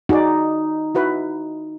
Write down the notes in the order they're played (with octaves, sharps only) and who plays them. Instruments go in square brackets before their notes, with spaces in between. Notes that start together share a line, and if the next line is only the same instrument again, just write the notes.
[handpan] D#4 [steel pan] F#4 G#4 D5
[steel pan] E4 F#4 B4